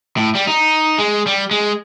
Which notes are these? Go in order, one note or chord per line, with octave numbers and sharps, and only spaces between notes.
A2
G3
D#4
G#3
G3
G#3